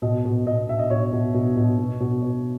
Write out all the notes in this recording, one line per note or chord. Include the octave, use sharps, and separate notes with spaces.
B2 D#5
B2
B2 D#5
B2 E5
D#5
B2 C#5
B2
B2
B2
B2
B2
B2